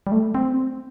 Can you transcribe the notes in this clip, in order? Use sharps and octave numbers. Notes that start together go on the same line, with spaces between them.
G3
A3
C4